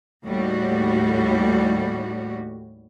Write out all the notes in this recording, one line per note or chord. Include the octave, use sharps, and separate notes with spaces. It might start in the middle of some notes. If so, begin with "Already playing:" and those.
D#2 A2 G3 F#4